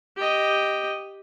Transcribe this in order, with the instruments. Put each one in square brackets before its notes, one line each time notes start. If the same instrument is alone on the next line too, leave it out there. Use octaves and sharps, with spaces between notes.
[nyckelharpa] G4 D#5